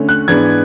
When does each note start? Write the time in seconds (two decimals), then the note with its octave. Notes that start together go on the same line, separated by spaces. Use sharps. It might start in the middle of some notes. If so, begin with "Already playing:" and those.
Already playing: D3 A3 C#4
0.09 F#6
0.28 G#2 E3 B3 D4 G#6